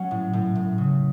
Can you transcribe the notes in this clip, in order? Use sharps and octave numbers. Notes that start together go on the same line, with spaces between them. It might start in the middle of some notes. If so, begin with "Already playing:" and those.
Already playing: F#3 C#4
A2
A2
A2
C#3